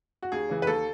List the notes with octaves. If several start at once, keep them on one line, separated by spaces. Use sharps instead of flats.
F#4
D#2 G#4
C#3 E3
B4
D#2 A4